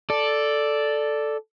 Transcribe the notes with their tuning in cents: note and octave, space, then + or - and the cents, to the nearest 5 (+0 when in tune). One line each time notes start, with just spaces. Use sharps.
A4 +0 D5 +0